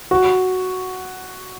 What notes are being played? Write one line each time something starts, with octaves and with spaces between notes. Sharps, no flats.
F#4